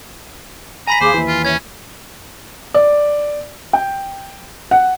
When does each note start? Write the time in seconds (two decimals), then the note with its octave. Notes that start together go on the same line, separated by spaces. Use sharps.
0.87 G#5 A#5 B5 B6
1.01 D#2 G#4 C5 F5 D6
1.14 D#2 E3 E5
1.28 F4
1.45 C#4 C#5 E5 G#6
2.74 D5
3.73 G5
4.71 F#5